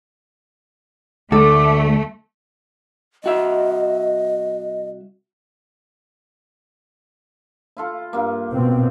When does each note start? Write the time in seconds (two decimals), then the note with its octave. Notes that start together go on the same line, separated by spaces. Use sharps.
1.32 D2 A3 A4 D6
3.24 C2 F#4 D#5 E5
7.77 E4 F4 A4
8.13 G2 A#3
8.53 B2 C4